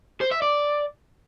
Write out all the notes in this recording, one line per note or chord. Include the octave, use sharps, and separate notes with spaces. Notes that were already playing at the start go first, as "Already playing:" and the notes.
C5
E5
D5